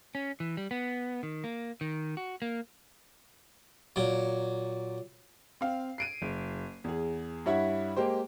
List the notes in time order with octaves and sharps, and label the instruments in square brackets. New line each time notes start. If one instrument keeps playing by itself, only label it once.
[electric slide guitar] C#4
E3
G3
B3
D#3
A#3
D#3
F#4
A#3
[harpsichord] A#2 F#3
[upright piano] C4 F5
C7 D7 D#7
F#1
E2 G#4
G2 E4 C#5 E5 F#5
G#3 A#3 G4 C5